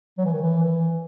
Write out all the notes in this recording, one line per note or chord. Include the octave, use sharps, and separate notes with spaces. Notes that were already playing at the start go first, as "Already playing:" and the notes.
F#3
E3
D#3
E3
E3